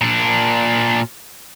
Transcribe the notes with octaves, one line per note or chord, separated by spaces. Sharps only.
A#2 D4